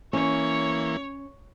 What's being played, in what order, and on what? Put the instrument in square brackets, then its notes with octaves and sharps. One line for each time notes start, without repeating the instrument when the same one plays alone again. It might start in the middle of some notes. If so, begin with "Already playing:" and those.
[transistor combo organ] E3 A#3 [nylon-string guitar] C#4 [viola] C#5